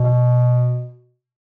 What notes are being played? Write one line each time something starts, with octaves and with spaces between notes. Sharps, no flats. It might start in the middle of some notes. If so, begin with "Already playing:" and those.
Already playing: B2